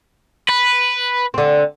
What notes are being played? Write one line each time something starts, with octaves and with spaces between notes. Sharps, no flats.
B4
D3 C4